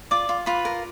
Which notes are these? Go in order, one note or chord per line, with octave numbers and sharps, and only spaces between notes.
F4 D5 D6
F4
F4 B4 B5
A#4